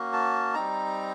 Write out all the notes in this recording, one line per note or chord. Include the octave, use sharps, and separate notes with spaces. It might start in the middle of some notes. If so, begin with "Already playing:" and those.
Already playing: A#3 C#4 F#4
A5
G3 C4 D#4 A#5